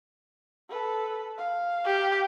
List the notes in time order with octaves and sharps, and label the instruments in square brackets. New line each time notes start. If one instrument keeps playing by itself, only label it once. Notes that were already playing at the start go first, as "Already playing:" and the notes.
[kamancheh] A4 B4
F5
[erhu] G4